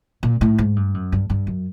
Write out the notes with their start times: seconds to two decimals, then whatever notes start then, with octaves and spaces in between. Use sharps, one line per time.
0.23 A#2
0.41 A2
0.58 G#2
0.76 G2
0.94 F#2
1.12 G2
1.30 G2
1.47 F#2